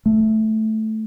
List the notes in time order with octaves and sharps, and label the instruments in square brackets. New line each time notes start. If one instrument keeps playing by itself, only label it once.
[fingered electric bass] A3